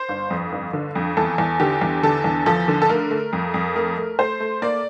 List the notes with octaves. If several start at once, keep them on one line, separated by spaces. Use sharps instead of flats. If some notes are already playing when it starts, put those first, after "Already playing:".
Already playing: C5
G1
F2
G1
D3
F2
E2 A4
E2
D3 G4
E2
D3 A4
E2
F3 A4
D3
A4
A3 A#4
A3
F2
F2
A3 A#4
A3
A3 C5
A3
A#3 D5